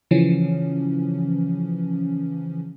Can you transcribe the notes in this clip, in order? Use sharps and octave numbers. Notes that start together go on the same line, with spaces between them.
C#3 E3 F3 C#4